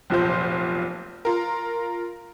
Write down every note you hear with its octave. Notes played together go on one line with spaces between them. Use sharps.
F1 B1 A#2 F4 C5 G6
F4 A#4